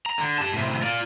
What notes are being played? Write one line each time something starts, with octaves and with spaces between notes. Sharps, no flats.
A#5
D3
G4 A5
A2 C3
F4 D5